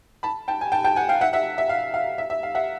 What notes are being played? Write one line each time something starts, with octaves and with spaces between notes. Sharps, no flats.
A5 B5
G5 A5
G#5
G5 A5
G5 A5
F#5 G#5
F5 G5
E5 F#5
E5 F#5
E5
F5
F5
E5
E5
F5
E5 F#5